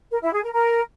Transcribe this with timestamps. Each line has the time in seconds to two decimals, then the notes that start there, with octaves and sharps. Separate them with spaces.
0.11 A#4
0.22 E4
0.32 G#4
0.43 A#4
0.54 A#4